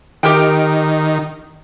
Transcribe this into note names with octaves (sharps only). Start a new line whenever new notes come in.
D#3 G4 A#4 G5